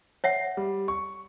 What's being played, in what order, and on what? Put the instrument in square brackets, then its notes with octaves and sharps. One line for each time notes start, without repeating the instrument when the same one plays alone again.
[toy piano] C#5 E5 F#5
[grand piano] G3
C#6